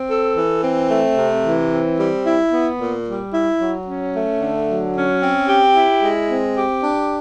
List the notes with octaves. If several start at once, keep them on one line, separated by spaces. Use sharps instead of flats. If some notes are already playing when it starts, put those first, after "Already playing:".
Already playing: C4
A4
E3
C4
A3
C3
E3
C4
G3
E4
B3
A#2
G3
E4
F#3
C#4
A3
D3
F#3
C#4
C4
G4
E4
G#3
C4
G4
D4